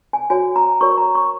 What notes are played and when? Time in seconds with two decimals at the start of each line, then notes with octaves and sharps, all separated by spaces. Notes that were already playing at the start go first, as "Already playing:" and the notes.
0.13 G#5
0.30 F#4 C#5 G#5
0.56 A#5
0.81 F#4 A#4 C#5 C#6
0.98 A#5
1.15 C#6